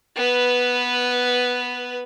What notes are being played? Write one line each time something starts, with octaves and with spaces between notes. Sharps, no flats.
B3 B4